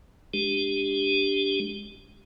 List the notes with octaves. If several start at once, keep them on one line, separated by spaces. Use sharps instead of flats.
G#3 D4 G4